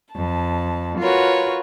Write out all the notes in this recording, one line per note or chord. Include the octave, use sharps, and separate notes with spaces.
F2 A5
F4 F#4 A#4 B4 C#5